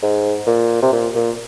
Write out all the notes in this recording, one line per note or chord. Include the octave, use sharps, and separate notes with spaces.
G#2
A#2
C3
A#2
A#2